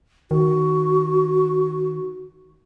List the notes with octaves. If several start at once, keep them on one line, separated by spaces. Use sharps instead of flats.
D#3 F#4